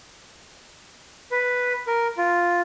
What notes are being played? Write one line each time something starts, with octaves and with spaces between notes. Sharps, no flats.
B4
A#4
F4